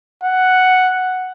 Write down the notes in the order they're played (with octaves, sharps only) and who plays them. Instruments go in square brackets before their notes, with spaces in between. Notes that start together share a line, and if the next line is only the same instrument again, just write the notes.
[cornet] F#5